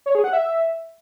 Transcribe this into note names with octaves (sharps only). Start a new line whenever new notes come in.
C#5
G#4
F#5
E5